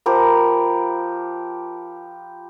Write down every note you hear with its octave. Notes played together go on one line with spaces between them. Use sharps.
F3 G4 A#4 B5